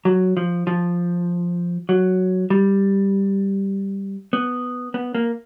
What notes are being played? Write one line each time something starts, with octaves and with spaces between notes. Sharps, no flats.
F#3
F3
F3
F#3
G3
B3
B3
A#3